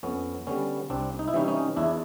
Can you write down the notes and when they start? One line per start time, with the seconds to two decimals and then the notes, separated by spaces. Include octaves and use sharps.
0.03 F2 B3 C#4
0.47 D3 G3 B3 C#4
0.90 C2 C4 D4
1.19 D#4
1.28 E4
1.33 C3 E3 G3 C#4 D#4
1.48 C#4 D#4
1.76 E2 D4 E4